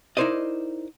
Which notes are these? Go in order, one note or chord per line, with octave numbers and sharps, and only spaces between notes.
D#4 E4 A#4 C5 D5 D#5